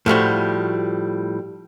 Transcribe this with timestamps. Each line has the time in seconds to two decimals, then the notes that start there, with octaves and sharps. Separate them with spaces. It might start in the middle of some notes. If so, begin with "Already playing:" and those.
0.06 A2 F3 G3 F#4